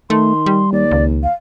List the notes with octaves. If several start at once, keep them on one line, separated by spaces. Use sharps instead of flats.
D#3 A3 C6
G3
D#2 D5
C#2
F5